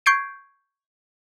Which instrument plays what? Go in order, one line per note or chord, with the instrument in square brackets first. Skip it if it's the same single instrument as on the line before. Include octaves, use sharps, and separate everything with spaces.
[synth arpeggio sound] C#6 G6 G#6 C7 D7